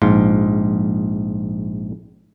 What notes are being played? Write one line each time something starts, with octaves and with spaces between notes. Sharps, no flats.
A#1 G#2 F4